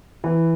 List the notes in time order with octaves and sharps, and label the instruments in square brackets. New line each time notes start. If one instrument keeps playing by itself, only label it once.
[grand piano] E3